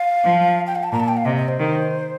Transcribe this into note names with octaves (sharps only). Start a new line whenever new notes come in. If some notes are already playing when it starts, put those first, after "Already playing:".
Already playing: F5
F3
G5
F5
A5
A#2 A#5
A5
G5
F5
C3 D#5
D#5
C5
D#3